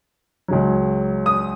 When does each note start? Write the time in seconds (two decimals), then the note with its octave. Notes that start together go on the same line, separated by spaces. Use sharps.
0.48 C#2 C#3 F#3
1.26 D#6